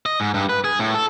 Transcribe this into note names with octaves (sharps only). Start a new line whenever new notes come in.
D#5
G#2
G2
B4
G#4
A2
A4